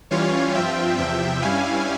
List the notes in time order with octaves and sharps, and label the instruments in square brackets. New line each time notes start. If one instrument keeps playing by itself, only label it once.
[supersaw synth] E3 G3 C#4 F4 C#5 F5
G2 F3 C4 F4 E5 G5
E2 C3 F3 E5 G5
G2 G3 C#4 E4 F5 G#5